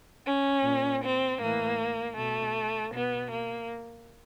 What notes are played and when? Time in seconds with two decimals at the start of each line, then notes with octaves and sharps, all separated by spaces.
0.26 C#4
0.64 A#2
1.03 C4
1.40 A2 E3 A#3
2.16 B2 A3
2.92 B2 B3
3.30 A#3